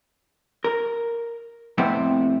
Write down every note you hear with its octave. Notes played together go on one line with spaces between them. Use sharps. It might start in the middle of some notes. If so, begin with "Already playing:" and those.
A#4
F2 A2 C3 B3 C4